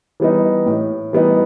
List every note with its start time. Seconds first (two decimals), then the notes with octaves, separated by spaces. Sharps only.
0.20 E3 G3 B3 D#4
0.66 A2
1.13 E3 G3 B3 D#4